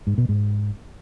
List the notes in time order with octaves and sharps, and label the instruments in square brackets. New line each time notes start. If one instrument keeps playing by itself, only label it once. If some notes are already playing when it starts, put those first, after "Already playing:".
[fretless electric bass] G#2
B2
G#2